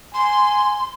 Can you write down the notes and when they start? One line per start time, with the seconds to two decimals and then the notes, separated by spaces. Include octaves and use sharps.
0.14 G#5 C6